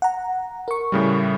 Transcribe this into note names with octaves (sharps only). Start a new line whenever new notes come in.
F#5 A#5
A#4 C#6
A2 C#3 G3